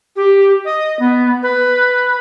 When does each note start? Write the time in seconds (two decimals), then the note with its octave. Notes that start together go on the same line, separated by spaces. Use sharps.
0.16 G4
0.65 D#5
0.99 B3
1.43 B4